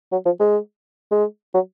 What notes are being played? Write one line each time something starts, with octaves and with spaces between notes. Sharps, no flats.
F#3
F3
G#3
G#3
F#3